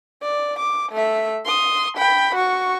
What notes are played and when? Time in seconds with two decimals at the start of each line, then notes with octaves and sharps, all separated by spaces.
0.22 D5
0.59 D6
0.92 A3 E5
1.45 C6 D#6
1.97 G5 B5
2.35 F#4 C#6